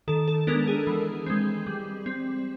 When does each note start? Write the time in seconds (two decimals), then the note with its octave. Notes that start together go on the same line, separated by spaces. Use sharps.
0.08 D#3 A4
0.28 A4
0.47 G#3 B3 D4 A#4
0.68 G#4
0.87 E3
1.26 G#3 C4
1.67 G3
2.06 C4